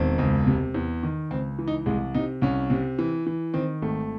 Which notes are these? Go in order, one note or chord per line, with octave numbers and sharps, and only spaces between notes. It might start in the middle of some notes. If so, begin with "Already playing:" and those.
Already playing: E1 D#3 C4
C#2
C3
E2
D#3
C#2 C4
E3
D#4
C2 G#3
C3 D#4
C2 C#4
C3
E3
E3
D#3 C4
G#1 A3